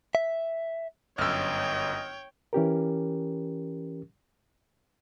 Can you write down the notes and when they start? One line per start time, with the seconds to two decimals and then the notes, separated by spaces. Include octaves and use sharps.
0.15 E5
1.18 G1 F#2 C#5 D#5 G5 E6 F6
2.53 E3 C#4 G4 A#4